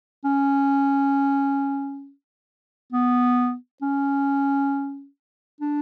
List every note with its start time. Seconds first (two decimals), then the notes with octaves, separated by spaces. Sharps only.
0.24 C#4
2.92 B3
3.82 C#4
5.61 D4